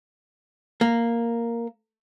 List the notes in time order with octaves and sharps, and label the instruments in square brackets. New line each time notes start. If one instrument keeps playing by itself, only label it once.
[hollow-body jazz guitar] A#3